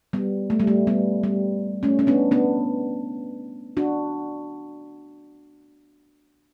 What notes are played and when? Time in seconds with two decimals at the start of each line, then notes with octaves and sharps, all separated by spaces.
0.13 G3 B3
0.50 A3
0.60 G3
0.67 A3
0.87 G3 B3
1.23 G3
1.83 A3 C#4
1.99 C#4
2.07 B3 D4
2.31 B3 D4
3.77 D4 F#4